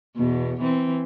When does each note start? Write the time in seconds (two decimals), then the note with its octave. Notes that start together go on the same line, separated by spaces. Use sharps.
0.16 E2 B2
0.61 E3 C4